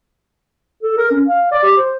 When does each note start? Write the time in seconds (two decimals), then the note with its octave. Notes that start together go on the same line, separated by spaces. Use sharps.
0.83 A4
0.97 A#4
1.11 C#4
1.27 F5
1.51 D5
1.63 G4
1.77 C5